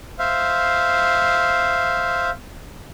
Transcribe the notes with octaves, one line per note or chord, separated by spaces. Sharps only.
C5 E5 F5